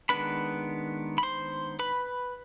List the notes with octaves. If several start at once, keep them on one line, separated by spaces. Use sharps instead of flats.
D#3 G#3 B3 D4 B4 B5
B5
C5 C6
B4 B5